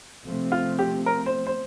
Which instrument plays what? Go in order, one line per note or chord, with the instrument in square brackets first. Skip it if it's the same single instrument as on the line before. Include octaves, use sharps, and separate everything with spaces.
[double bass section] C3 F3 A3 C4
[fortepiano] F4
G4
A#4
C5
C5